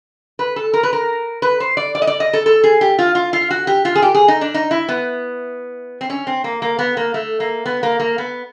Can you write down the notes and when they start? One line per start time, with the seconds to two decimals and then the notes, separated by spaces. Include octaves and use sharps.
0.39 B4
0.56 A4
0.73 A#4
0.83 B4
0.93 A#4
1.42 B4
1.60 C5
1.77 D5
1.95 D5
2.02 D#5
2.07 D5
2.20 D#5
2.33 A4
2.46 A4
2.64 G#4
2.81 G4
2.99 F4
3.15 F4
3.33 F4
3.50 F#4
3.67 G4
3.85 F4
3.95 G#4
4.02 G4
4.14 G#4
4.28 D#4
4.41 D4
4.54 D#4
4.71 E4
4.88 B3
6.01 C4
6.10 C#4
6.27 C4
6.44 A#3
6.62 A#3
6.79 B3
6.97 A#3
7.14 A3
7.40 A#3
7.66 B3
7.83 A#3
8.00 A#3
8.18 B3